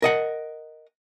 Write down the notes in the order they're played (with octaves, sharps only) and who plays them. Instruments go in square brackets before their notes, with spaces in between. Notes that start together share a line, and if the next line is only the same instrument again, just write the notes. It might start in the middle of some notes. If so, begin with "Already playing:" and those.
[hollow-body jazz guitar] A#4 D#5 F#5